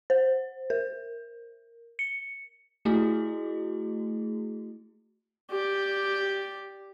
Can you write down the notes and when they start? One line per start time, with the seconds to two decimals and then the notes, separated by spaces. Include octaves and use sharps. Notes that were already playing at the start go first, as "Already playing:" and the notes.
0.10 C5
0.70 A#4
1.99 C#7
2.85 A3 E4 F#4 G#4
5.51 G4 D5